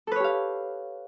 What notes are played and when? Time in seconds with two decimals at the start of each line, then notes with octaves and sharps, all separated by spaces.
0.07 A4
0.11 B4
0.16 C#5
0.20 G4
0.24 F5